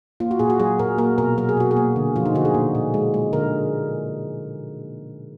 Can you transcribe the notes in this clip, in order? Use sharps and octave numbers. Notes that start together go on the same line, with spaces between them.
A#3 F4
F#4
A#2 G#4
F#4
F#3 G#4
A#2 A#4
A#3 A#4
B2 A#4
F#3 A#4
G#4
B2 F#4
G#4
A#3
D3
F3 F4
D#4
D3 F#4
G#4
A#2
A#2
G#3
G#3
D3 A#4